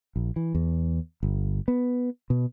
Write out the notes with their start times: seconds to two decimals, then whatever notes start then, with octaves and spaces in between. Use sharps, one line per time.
0.16 A#1
0.36 E3
0.55 E2
1.23 G1
1.68 B3
2.30 B2